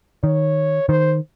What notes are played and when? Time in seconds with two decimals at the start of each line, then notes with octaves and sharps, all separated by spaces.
0.24 D#3 C#5
0.89 D#3 C5